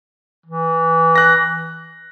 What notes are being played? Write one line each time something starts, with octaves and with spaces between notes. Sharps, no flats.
E3
F#6 A#6